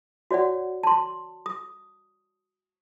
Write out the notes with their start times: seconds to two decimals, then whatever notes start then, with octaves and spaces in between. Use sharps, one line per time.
0.31 F#4 C#5 D5 F#5
0.83 A5 C6
1.46 D#6